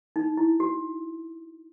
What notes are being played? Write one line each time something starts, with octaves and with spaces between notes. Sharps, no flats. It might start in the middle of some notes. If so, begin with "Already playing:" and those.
D#4
E4
F#4